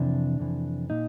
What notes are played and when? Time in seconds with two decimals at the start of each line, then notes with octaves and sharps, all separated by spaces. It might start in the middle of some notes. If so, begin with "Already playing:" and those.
Already playing: F2 C3 E3 D4
0.39 F2 C3 E3
0.90 A#2 D#4